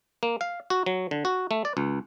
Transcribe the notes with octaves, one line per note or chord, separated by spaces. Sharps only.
A#3
F5
F#4
F#3
D3
F#4
A3
D5
C#2